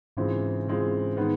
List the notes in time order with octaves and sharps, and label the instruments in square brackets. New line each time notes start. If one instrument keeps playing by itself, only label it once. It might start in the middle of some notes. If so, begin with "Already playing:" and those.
[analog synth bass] G#2 [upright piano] C#3 E3 G#3 C4 F4
[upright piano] C#3 E3 G#3 C4 F4
D#3 G#3 B3